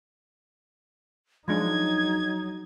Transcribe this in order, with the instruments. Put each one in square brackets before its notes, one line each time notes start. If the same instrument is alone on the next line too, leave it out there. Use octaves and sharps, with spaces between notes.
[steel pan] F3 G#3 D4 [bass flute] F#3 [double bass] D#4 [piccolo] G#6